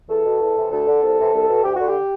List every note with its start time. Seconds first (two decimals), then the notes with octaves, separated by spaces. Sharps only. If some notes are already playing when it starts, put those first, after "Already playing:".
0.09 E2 A4
0.25 B2
0.40 E2
0.55 C3 E3
0.71 D2 A4
0.87 D3
1.02 C2
1.17 C3 E3
1.32 C2
1.49 B2
1.63 D2 G4
1.75 D3 F#4
1.87 G4